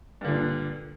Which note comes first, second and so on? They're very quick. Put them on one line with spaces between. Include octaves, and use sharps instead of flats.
G2 D3 A#2